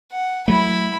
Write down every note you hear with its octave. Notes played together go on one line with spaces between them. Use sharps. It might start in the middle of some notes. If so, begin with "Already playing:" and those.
F#5
F#3 A3 E4 B5